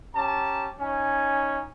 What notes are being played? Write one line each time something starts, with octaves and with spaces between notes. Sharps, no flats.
C#4 G4 A5 A#5
C#4 D#4 G#5